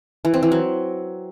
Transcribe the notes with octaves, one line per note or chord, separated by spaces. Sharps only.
E3
C4
E3
F#3